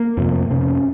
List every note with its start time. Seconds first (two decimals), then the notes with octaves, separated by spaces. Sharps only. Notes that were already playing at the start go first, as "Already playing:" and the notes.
Already playing: A#3
0.17 F2 C3
0.50 F2 C3 C#4